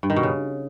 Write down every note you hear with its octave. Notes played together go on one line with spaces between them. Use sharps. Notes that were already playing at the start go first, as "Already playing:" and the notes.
G2
D#3
B2
C#3